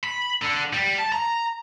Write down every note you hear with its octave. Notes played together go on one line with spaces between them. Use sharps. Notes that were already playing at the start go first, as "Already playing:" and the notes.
B5
D3
G3
A5
A#5